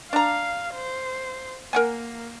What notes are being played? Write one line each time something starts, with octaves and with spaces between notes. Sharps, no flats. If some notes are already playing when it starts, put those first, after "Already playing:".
D4 F5 A#5
C5
A#3 A#4 F#5 G#5